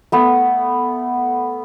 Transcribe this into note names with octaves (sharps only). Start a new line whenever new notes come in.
A3 B3